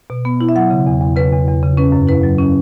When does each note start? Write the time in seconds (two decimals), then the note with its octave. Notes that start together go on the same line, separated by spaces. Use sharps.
0.10 B2
0.25 B3
0.41 E4
0.49 E5
0.56 F#3 F#5
0.70 C#3
0.87 E2
1.01 E2
1.16 C#3 B4
1.32 E2
1.48 E2
1.63 C#3
1.77 C#4 B4
1.92 F#2
2.07 E4 B4
2.23 F#3
2.39 C#4